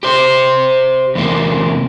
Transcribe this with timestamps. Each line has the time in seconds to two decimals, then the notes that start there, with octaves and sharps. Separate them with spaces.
0.03 G4 C5
1.15 E2 C3 A#3